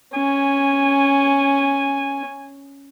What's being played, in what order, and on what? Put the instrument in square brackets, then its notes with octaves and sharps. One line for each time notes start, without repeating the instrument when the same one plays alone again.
[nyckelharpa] C#4 [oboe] G#5